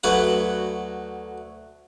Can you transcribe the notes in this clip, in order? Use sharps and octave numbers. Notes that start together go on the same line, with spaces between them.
D2 F#3 B4 F#5